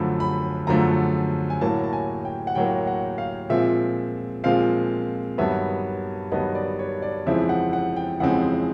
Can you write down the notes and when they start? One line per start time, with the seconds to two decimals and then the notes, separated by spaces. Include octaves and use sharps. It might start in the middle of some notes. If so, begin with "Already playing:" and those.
Already playing: F#2 D3 F3 A3 B5
0.20 B5
0.67 F#2 D3 F3 A3 A#5
1.50 G#5
1.61 A2 F#3 A#3 A5
1.84 A5
1.93 G#5
2.25 G5
2.47 F#5
2.55 A2 F#3 A#3 G5
2.87 F#5
3.18 F5
3.50 A#2 F3 G#3 C4 E5
4.44 A#2 F3 G#3 C4 F5
5.38 G2 D#3 F#3 B3 E5
6.32 G2 D#3 F#3 B3 D#5
6.55 D5
6.79 C#5
7.02 D5
7.27 F2 C#3 E3 G#3 C4 E5
7.49 F#5
7.73 F#5
7.96 G5
8.20 F2 C#3 E3 G#3 C4 F#5